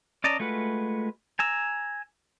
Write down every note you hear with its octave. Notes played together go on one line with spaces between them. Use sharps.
C#4 D5 D#5 A5 A#5
G#3 A3 F4 F#4 B4
G#5 A#5 E6